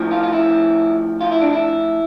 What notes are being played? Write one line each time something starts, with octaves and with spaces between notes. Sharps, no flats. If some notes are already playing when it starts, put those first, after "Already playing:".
Already playing: A2 F3
F4
F4
E4
F4
E4
D4
E4